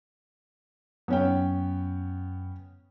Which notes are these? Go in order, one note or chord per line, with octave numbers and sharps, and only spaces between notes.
F#2 B3 C#4 G5